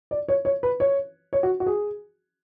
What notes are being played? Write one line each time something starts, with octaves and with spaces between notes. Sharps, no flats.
D5
C#5
C#5
B4
C#5
C#5
F#4
F#4
G#4